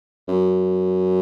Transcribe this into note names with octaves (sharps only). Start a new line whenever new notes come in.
F#2